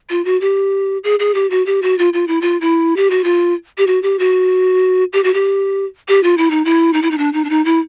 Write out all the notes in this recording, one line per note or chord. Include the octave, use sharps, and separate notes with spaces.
F4
F#4
G4
G#4
G#4
G4
F#4
G4
F#4
F4
F4
E4
F4
E4
G4
F#4
F4
G4
F#4
G4
F#4
G4
F#4
G4
G4
F4
E4
D#4
E4
D#4
E4
D#4
D4
D#4
D4
D#4
E4